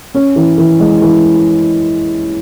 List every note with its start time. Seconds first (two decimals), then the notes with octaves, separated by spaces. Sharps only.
0.15 C#4
0.36 E3
0.58 E3
0.80 G#3
1.02 E3